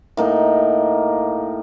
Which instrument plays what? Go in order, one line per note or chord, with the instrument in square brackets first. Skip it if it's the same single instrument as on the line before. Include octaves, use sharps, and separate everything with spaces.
[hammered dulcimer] A2 A#3 D#4